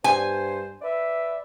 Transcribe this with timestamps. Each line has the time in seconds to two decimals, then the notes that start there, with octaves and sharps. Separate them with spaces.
0.04 G2 C5 G#5
0.82 B4 D5 E5